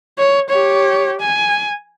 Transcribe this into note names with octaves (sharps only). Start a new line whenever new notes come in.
C#5
G4 C#5
G#5